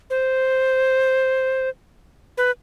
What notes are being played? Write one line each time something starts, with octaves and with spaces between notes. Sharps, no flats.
C5
B4